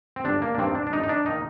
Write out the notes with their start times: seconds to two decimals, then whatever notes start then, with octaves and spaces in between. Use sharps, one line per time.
0.16 C4
0.24 G1 D4
0.42 A#3
0.54 D4
0.58 G2 D#3 A#3 C4
0.75 D4
0.87 D4
0.92 G1 D#4
1.03 D#4
1.09 D4
1.26 D#3 A#3 D#4